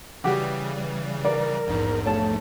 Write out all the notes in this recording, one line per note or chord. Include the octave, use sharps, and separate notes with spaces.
C#3 E3 G3 F#4 G4
A#4 D5
A#1 E2 G#2
A3 C#5 A5